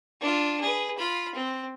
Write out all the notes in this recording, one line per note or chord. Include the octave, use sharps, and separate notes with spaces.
D4 F4
G#4 B4
F4 B5
C4